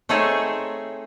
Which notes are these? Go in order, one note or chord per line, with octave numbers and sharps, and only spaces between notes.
A3 C4 D#4 G#4 A4 C#5